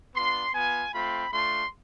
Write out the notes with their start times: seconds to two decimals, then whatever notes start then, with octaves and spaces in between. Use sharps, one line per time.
0.15 B3 D4 F4 C6
0.54 B3 F4 G#5
0.93 A3 C4 F4 B5
1.32 A3 D4 F4 C6